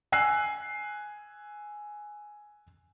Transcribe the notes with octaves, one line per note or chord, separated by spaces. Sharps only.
G#5 E6 F#6 C7